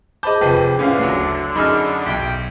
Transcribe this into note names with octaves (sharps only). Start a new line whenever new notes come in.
G#4 C5 D#5 A5 B5 D6 G6
F1 F2 B4 G5
A2 D3 C#4 B4 F5
F#1 D2 F#3 A3 C7
F#2 D#4 G#4 B5 E6 F6
B1 G5 B6